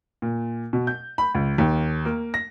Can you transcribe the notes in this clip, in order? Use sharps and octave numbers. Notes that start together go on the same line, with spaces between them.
A#2
B2
G6
B5
C#2
D#2
A#3
A#6